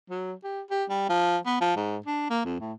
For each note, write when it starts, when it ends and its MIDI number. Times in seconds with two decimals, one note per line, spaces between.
0.10 0.33 54
0.44 0.61 67
0.71 0.85 67
0.90 1.05 55
1.09 1.37 53
1.46 1.59 59
1.61 1.76 53
1.76 1.97 44
2.06 2.29 62
2.30 2.42 58
2.45 2.57 41
2.60 2.73 45